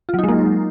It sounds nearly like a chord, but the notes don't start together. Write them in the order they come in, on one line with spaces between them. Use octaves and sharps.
F4 F#3 D#4 G#3 A#3